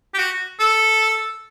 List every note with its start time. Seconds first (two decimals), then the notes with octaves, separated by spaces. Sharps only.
0.14 G4
0.18 F#4
0.59 A4